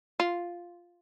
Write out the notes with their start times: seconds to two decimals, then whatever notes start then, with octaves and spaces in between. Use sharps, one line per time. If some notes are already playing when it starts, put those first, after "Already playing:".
0.20 F4